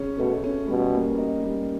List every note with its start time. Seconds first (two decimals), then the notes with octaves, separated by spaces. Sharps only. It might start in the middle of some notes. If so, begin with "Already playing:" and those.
Already playing: C#3 C#4
0.18 B2 A3
0.44 C#4
0.68 B2 G3
0.93 A#3
1.18 D#4
1.42 G3